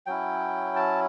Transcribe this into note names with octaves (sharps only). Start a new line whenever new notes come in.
F#3 C#4 E4 G5
A5